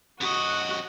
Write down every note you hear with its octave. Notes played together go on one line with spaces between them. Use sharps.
F#2 F#4 D#5 F#5